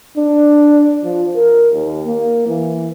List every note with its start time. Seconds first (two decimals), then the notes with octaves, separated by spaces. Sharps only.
0.17 D4
1.04 F3
1.35 A#4
1.72 D#2
2.06 A#3
2.47 E3